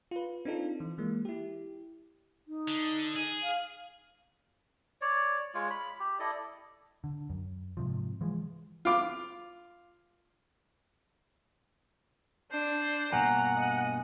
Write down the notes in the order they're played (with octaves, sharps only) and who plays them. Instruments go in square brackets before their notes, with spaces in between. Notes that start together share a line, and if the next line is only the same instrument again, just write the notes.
[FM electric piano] F4 B4
C4 D4 D#4 F4 A4
E3
E3 G#3 A#3
E4 G4
[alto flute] D#4
[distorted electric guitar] D3
G#4
[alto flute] F5
[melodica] C#5 D5
G#3 F4 C#5
B5
G4
E4 A4 D5 D#5
[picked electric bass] D3
F#2
G#2 C3 F3
E3 F3 G#3
[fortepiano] F4 D6
[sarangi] D4 [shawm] C5
[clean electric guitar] G2 B2 A#3 [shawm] F#5 [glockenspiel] G#5 [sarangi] A#5
[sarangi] D#5